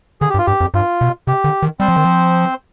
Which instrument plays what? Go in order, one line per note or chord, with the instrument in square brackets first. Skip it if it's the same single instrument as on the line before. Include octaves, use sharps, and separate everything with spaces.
[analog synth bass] D3 [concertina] G#4
[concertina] G4
[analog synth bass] G2
[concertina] F4
[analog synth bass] G2 [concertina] G4
[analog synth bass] F2
[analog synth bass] G2 [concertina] F4
[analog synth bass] B2
[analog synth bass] C3 [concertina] G4
[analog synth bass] D3
D#3
[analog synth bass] G3 [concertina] C4 C5
[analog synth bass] F3
D#3
F3